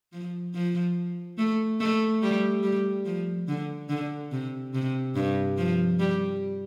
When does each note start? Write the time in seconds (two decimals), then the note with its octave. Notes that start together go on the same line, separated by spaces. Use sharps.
0.13 F3
0.54 F3
1.38 A3
1.80 A3
2.23 G3
2.63 G3
3.05 F3
3.48 D3
3.89 D3
4.32 C3
4.74 C3
5.16 G2
5.58 F3
5.99 G3